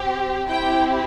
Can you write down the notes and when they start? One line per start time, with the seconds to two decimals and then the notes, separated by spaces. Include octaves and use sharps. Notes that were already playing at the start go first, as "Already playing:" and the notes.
Already playing: C4 G4
0.47 C4 E4 G4 G5